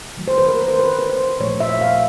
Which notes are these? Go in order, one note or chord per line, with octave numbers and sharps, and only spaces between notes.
D#3 F#3 A3
C5
B4
A#4
C5
B4
B4
C5
A#2 F3 A3 C#5
E5
F5